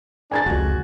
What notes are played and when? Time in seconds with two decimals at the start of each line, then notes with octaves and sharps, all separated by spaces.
0.31 D4 G#5 G#6 A6
0.46 F1 C#2 F#4